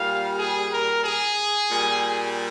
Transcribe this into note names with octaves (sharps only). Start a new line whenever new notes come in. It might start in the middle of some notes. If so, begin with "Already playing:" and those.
Already playing: A#2 G3 F5
G#4
A#4
G#4
A#2 G3